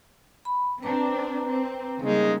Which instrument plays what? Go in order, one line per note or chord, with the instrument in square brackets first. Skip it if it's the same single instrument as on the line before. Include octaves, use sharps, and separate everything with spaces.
[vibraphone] B5
[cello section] C4 D4 [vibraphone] B4 A#5 D6
[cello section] C4
[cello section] C#3 G3 A#3 [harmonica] G#3 D#4